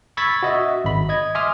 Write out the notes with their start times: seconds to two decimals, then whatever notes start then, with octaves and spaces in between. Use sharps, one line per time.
0.17 B5 C#6 E6 G#6 A6 B6
0.43 F#4 D#5 E5
0.84 G#1 B5
1.09 D#5 G#6
1.35 E5 G#5 C6 D6 D#6 F6